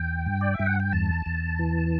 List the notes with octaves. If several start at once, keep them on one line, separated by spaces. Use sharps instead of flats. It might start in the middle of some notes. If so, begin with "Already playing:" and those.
Already playing: E2 G5
G2
D5
E5
G2
F#5
G5
E2 A5
E2
E3